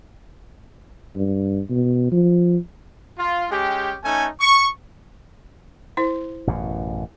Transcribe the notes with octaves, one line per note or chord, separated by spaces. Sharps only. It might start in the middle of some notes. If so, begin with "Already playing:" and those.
G2
B2
F3
F4
G#3 C#4 G4
A3 C#4 D#4 A4 G#5
C#6
E4 C5
A1 F#2 B2